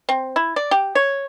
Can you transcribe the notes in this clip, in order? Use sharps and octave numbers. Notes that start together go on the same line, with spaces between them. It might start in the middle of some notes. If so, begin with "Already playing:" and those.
C4
E4
D5
G4
C#5